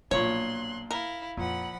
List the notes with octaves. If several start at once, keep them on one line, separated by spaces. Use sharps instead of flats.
B1 A#2 F3 A#3 D4 C#5 C6 F#6
E4 A#4 F5
F2 A#2 F3 F#5 B5